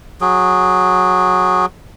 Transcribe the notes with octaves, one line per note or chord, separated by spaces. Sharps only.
F#3 G#4